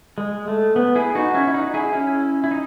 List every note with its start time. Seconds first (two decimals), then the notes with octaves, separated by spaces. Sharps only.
0.18 G#3
0.48 A3
0.76 B3
0.96 E4 G#4
1.15 D#4 F#4
1.34 C#4 E4
1.47 E4
1.54 D#4 F#4
1.74 E4 G#4
1.93 C#4 E4
2.44 E4
2.51 D#4